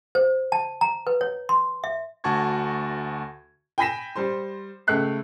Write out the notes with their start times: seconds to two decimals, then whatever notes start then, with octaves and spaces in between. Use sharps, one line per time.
0.15 C5
0.52 A5
0.81 A#5
1.07 B4
1.21 C#5
1.49 C6
1.84 E5
2.24 D2 F#4 A5 C#6 G#6
3.78 G5 G#5 B5 A#6 B6 E7
4.16 G3 C5 C6
4.87 C#2 A3 E5 F#6 C7